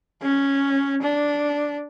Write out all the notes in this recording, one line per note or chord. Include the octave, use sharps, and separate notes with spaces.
C#4
D4